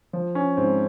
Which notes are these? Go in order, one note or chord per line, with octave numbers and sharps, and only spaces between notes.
F3
C#4
G#2 C4